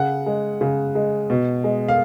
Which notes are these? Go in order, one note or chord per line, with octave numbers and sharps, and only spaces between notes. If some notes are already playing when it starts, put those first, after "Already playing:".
Already playing: C#3 F#5
G#3
C#3
G#3
B2
G#3
F5